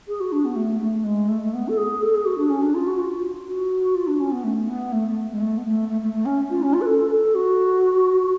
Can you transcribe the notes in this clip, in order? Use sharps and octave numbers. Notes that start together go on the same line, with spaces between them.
G#4
F#4
D4
B3
A3
A3
G#3
A3
A3
B3
A4
G#4
A4
G#4
F#4
D4
C#4
D4
F4
F#4
F4
F#4
F4
D4
C#4
B3
A3
B3
A3
A3
G#3
A3
B3
A3
A3
A3
A3
C#4
F4
C#4
F4
B4
A4
A4
F#4